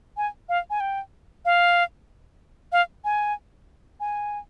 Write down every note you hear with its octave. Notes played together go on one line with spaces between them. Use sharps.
G#5
F5
G#5
G5
F5
F5
G#5
G#5